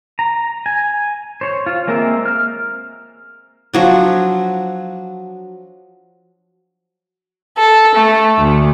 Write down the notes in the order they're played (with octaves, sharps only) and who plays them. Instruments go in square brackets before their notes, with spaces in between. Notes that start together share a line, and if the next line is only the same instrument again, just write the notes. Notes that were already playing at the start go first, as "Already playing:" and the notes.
[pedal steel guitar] A#5
G#5
C5 C#5
F4
G#3 A#3 C4 A#4 E5
F6
[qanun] F3 F#3 D4
[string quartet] A4
A3
D2